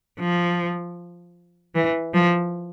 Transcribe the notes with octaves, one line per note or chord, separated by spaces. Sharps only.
F3
E3
F3